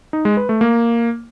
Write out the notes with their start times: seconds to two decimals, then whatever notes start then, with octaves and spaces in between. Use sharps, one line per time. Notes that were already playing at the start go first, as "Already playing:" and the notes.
0.13 D#4
0.25 G#3
0.37 B4
0.49 A3
0.61 A#3